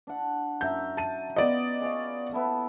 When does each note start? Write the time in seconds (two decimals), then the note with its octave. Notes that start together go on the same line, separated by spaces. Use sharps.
0.07 D4 F#5
0.61 F#2 E5 A#5 G6
0.97 A5 D#7
1.36 B3 F4 D5 D#5
1.81 G#4 C#5 F5
2.32 B3 E4 A4